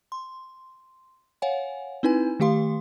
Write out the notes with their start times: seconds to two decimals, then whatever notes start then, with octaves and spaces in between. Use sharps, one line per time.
0.12 C6
1.42 C#5 F5 F#5 G#5
2.03 C4 D#4 E4 B4 G#5
2.40 D#3 A3 G4 F5 C6